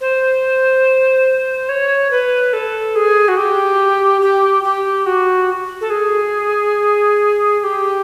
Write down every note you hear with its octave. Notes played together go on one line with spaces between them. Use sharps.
C5
C#5
B4
A4
G#4
F#4
G4
G4
G4
F#4
A4
G#4
G#4
G4